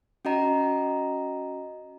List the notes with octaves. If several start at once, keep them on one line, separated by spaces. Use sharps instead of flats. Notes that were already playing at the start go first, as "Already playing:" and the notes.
C#4 F#4 D#5 A#5